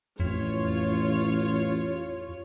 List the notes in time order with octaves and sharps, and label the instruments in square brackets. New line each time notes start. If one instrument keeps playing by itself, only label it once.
[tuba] A1 [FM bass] F2 [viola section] F4 C#5